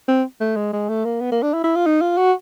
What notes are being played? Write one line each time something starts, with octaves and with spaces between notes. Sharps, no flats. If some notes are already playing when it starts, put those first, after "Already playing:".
C4
A3
G#3
G#3
A3
A#3
B3
A#3
D4
E4
E4
F4
D#4
F4
F#4